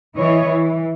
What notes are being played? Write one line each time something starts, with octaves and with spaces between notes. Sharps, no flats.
E3 E4 C#5 D#5
E3